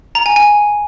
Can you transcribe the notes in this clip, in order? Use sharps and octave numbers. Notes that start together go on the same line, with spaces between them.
A#5
G#5
G#5